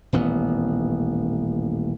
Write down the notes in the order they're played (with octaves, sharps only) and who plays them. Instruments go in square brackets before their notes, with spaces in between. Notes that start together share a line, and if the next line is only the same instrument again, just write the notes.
[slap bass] D#1 A1 B3